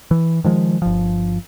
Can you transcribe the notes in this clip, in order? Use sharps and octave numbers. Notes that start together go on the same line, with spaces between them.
E3
D#3 F3 G#3
G1 F3